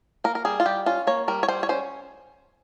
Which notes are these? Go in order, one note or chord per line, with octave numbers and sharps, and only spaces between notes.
A#3 A#4
A#4
G3 G#4
F4
G3 G4
C#4 F4
A#3 C#5
G3 A#4
C#5
G3 C5
C#5
C#4 C5